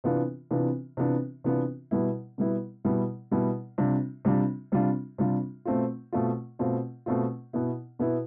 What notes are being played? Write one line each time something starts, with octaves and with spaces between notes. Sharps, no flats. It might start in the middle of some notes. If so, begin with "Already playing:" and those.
C3 E3 B3 D4 F4
C3 E3 B3 D4 F4
C3 E3 B3 D4 F4
C3 E3 B3 D4 F4
B2 G3 B3 E4
B2 G3 B3 E4
B2 G3 B3 E4
B2 G3 B3 E4
C3 G3 D4 F4
C3 G3 D4 F4
C3 G3 D4 F4
C3 G3 D4 F4
B2 A3 C4 F4
B2 A3 C4 F4
B2 A3 C4 F4
B2 A3 C4 F4
B2 B3 E4
B2 B3 E4